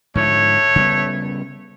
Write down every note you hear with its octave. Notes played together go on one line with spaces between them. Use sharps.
G#2 D3 F3 A3 C#5
C#3 G3 B3